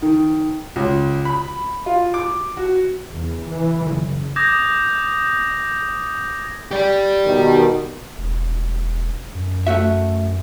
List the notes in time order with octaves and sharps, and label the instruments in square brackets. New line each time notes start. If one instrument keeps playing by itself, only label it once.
[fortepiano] D#3
C#2
B5
F4
D6
F#4
[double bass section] E2
E3
F#1
[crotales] D6 D#6 G6 G#6 A#6
[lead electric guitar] G4 D5
[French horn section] B2 D#3
[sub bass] E1
F#2
[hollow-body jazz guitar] A3 F#4 E5